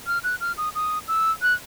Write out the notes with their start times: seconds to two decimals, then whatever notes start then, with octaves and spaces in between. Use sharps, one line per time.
0.07 F6
0.24 F#6
0.41 F6
0.58 D#6
0.75 D#6
1.08 E6
1.42 F#6